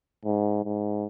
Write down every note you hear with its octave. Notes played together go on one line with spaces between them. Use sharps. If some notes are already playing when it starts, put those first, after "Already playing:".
G#2
G#2